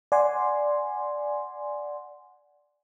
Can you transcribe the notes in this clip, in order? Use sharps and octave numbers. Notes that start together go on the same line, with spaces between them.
D5 F#5 G#5 C6